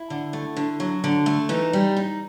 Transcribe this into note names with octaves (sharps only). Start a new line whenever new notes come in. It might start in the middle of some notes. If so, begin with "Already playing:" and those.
Already playing: E4
D3
A3
D3
F#3
D3
A3
E3 D#4
G3
D#4